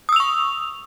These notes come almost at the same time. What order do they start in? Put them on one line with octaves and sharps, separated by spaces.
D#6 E6 F7 C#6